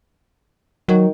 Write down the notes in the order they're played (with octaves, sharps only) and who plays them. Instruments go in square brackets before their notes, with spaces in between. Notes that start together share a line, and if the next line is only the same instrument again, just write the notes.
[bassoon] D#3 [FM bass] F#3